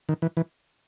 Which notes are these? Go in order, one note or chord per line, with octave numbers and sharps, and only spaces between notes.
D#3
E3
E3